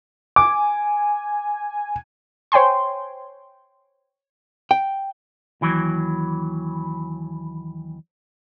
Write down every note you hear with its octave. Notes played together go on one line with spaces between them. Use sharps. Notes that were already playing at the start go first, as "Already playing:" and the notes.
G#5 D6
C5 C#5 G5 G#5 C6
G5
D#2 E3 F#3